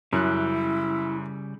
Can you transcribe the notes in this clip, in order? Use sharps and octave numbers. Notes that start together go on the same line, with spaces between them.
F#2 C#3 G3 E4 F#6